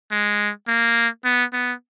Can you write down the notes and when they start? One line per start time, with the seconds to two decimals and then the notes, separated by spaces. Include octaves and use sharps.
0.11 G#3
0.68 A#3
1.24 B3
1.53 B3